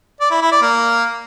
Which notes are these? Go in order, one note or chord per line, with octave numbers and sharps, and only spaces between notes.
D5
E4
E4
D5
A#3